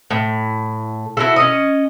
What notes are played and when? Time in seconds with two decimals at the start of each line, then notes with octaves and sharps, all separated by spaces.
0.11 A2
1.17 E4 F#4 A4
1.36 C#4 D#5